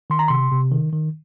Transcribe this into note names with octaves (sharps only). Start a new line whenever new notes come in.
D#3 C6
A#5
C3 C6
C3
D#3
D#3